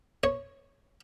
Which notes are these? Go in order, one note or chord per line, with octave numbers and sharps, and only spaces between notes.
C#5